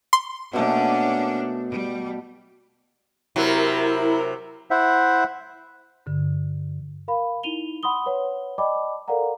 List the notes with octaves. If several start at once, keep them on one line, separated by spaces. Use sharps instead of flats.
C6
B2 A3 A#3 C#4 D4
G3
C3 F#3 E4 A#4
E4 C5 E5 F#5
G2 D3
A#4 F5 B5
D#4 E4 D#7 F7 G7
F#5 B5 C6 D#6 G7
B4 C#5 F#5
D5 D#5 G5 A5 B5 D6
A4 A#4 D5 F5 F#5 A#5